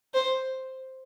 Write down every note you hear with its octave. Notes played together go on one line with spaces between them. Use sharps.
C5